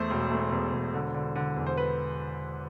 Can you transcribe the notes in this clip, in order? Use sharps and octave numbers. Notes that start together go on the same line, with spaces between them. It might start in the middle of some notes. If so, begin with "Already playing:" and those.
Already playing: E2 A3 C5
E1
A3
E2
E1
D3
D3
D3
E2
C5
B4